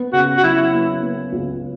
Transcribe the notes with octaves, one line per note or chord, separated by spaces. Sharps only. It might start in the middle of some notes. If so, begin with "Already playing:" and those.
Already playing: B3
C#3 F#4
F#4
F#3 E4
B3
B3
C#2